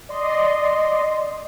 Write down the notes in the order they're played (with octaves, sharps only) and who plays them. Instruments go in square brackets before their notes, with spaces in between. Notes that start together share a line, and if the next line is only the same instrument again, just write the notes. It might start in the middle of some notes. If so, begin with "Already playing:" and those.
[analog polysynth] D5 D#5 C6